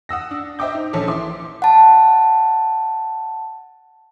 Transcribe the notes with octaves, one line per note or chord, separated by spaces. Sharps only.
F#5 D#6 E6 A#6
D4
C5 D#5 E5 G5 D6 G6
D#4
A#1 C#4 A4
E3 E5 C6 D6
F#5 A5